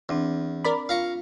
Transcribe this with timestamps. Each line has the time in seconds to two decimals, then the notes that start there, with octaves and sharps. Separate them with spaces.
0.09 E2 C4 D4
0.64 A#4 D5 B5
0.89 F4 F5 A#5 C#6